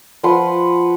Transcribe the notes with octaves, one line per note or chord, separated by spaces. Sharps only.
F3 B4 F#5 C6